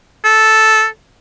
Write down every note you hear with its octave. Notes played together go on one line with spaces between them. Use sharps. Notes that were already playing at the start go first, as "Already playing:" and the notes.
A4